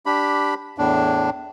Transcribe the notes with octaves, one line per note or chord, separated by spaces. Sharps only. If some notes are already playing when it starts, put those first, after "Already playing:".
D4 G4 B5
E2 A2 D4